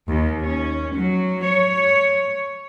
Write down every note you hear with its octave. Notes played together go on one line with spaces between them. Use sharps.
D#2
C#4
F#3
C#5